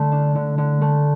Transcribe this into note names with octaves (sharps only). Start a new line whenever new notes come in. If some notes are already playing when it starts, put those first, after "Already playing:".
Already playing: D3 A3
D4
D3
D3
A3